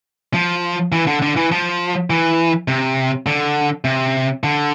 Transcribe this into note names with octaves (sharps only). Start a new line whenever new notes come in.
F3
E3
D3
D3
E3
F3
E3
C3
D3
C3
D3